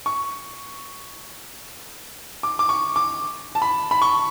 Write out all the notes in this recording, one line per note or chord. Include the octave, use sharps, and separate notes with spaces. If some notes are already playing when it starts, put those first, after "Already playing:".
C#6
D6
D6
C#6
D6
A5
B5
B5
C#6